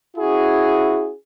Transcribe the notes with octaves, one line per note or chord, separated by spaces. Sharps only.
C#4 E4 F#4 G#4